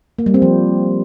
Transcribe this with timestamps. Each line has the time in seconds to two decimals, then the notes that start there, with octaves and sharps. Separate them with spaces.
0.19 A#3
0.26 G3
0.34 C4
0.42 F3